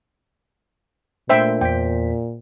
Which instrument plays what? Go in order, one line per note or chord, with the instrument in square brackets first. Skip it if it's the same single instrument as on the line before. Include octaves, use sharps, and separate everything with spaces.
[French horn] A#2 [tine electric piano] A3 D4 A#4 [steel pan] C5 E5 G5
[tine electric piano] E2 C5 B6 [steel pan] G5